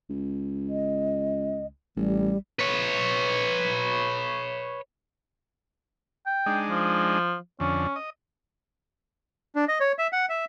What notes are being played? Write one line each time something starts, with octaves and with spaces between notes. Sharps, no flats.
C#2
D#5
A1 G3
B4 C#5
G5
G#3 D4 D#4
F3
F2 D3 C#4
D#5
D4
D#5
C#5
E5
F#5
E5